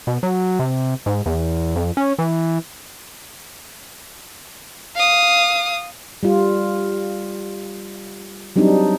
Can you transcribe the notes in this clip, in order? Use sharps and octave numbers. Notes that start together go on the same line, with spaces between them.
B2
F#3
C3
G#2
E2
F2
C#4
E3
F5 D#6
G3 F4
F#3 G3 C4 D4 D#4